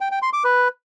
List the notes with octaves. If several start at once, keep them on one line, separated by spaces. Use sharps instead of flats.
G5
G5
C6
D6
B4